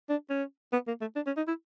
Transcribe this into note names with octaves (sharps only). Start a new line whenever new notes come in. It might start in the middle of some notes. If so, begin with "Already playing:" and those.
D4
C#4
B3
A#3
A3
D4
C#4
D#4
E4